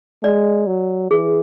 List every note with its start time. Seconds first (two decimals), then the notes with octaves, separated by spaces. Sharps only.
0.23 G#3 D5
0.67 F#3
1.11 E3 G#4